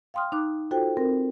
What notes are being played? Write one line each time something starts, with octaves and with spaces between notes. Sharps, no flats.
F5 G5 C6 D#6 F6
D#4 A#5 D6 F#6
F4 F#4 A4 C5 G5
C4 A#4